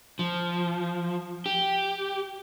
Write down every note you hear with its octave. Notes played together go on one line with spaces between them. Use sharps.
F3
G4